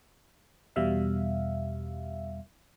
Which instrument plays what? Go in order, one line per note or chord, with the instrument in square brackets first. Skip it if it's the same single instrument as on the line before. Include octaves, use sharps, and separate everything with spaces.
[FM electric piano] E2 B2 G3 E5 F5